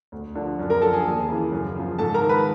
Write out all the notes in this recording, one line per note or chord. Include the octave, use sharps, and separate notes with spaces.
D2
D3 F3
F#2
A#4 A#5
D3 F3 A4 A5
G#4 G#5
D#2
C#3 E3
F#2
C#3 F3
G#2 A4 A5
A#4 A#5
D#3
B4 B5